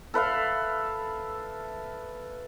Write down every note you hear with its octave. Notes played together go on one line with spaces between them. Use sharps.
A4 B4 E5 F5